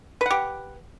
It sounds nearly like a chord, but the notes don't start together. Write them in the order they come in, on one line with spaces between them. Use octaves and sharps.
B4 F#5 G4